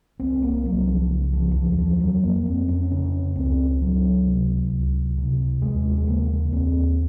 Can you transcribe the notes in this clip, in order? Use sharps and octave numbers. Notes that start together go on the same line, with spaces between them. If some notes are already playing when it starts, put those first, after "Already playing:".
C2 C4
A#3
C2 F#3
F3
C#3
F3
D#2 F3
F#3
F3
F2 F#3
A#3
F2 C4
C#4
C#3 C#4
C#2 C4
C#2 F#3
C3
C#2
C3
D#2 G#3
G#3
C#3 A#3
D#2 C4